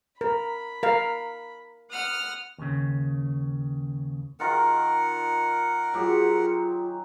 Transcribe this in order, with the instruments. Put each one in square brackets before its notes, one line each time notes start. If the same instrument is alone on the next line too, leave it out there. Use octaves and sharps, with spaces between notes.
[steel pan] A#4 [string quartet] B5
[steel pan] A#4 F5
[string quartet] F#5 D#6 F6
[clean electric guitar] D#2 C#3
[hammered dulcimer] D#3 F4 A#5 [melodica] A#4 F#5
[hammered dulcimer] F#3 G4 G#4 [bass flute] F4